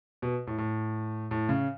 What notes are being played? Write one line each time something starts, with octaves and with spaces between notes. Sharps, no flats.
B2
A2
A2
A2
C#3